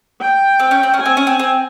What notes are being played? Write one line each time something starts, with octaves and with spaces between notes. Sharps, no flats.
G5
C4
C#4
C4
C#4
G#5
C4
C#4
C4
C4